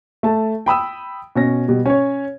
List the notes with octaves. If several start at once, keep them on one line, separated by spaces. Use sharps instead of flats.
A3 A5
G5 B5 D#6 E6
B2 C#4 A#6
B2 G3
C#4 C#5